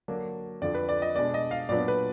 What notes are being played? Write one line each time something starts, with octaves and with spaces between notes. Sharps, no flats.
D3 F#3 A#3 D4
F2 D3 F3 D5
B4
D5
D#5
B2 G#3 D4 D5
D#5
F5
A#2 F#3 B3 D4 D5
B4